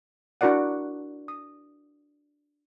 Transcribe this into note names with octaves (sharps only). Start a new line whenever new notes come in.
D4 E4 F#4 A#4 D5 F#5
D#6